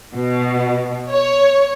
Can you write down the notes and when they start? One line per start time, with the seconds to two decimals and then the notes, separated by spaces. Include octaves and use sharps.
0.14 B2
1.12 C#5